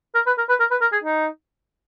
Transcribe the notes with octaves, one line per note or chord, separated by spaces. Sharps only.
A#4
B4
A#4
B4
A#4
B4
A#4
G#4
D#4